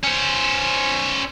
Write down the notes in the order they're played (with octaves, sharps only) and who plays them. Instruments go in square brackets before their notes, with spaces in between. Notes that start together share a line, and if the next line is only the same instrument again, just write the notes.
[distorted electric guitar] C#4 C5